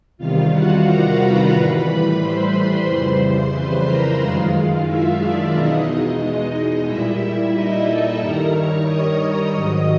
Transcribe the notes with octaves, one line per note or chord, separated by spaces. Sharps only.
E2 C3 D#3 G3 F4 F5
F#4 F#5
A#4 A#5
B4 B5
A2 E3 G3
C5 C6
F2 C#3 E3 G3
B4 B5
A#4 A#5
F#2 D#3 G#3 F4 F5
F4 F5
E4 E5
D4 D5
E2 B2 G#3 D#4 D#5
A#2 G3 E4 E5
D#4 D#5
A4 A5
G2 D#3 G3 A#4 A#5
C#5 C#6
D#5 D#6
G#2 D#3 F#3